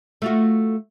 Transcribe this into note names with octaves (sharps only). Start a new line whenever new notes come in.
A3 F4 F#4